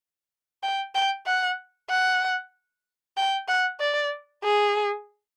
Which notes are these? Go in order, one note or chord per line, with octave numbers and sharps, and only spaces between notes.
G5
G5
F#5
F#5
G5
F#5
D5
G#4